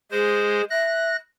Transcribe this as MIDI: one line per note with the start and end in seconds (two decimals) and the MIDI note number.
0.12 0.62 56
0.12 0.64 68
0.12 0.62 72
0.70 1.11 76
0.70 1.16 90
0.70 1.16 94